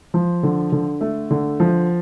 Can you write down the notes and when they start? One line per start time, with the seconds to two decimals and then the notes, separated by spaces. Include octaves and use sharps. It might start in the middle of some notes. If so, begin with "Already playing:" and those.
0.14 F3
0.43 D3
0.72 D3
1.01 A3
1.31 D3
1.60 F3